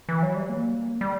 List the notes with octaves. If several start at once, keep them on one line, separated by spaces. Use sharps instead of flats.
E3
F#3
G3
A#3
G3